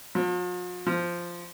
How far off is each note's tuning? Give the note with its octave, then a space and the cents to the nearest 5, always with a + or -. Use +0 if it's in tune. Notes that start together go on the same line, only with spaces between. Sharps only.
F3 +45
F3 -5